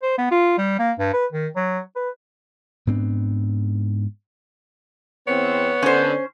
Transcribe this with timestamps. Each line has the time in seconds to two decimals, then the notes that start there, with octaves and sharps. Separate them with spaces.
0.02 C5
0.18 B3
0.31 F4
0.58 G3
0.79 A#3
0.99 G2
1.13 B4
1.32 D#3
1.56 F#3
1.96 B4
2.87 G#2 B3 C4 D4
5.27 E2 B3 C4 C#5
5.82 D3 C#4 C5